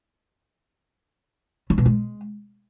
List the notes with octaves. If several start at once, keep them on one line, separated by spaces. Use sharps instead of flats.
C#3
B2
G#3